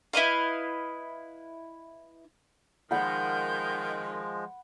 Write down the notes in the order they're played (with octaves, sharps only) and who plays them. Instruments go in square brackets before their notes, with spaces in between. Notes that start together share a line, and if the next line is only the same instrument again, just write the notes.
[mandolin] E4 B4 D#5 F5
[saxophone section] D#3 [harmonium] F3 G#3 [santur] F#5 B5 [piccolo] G6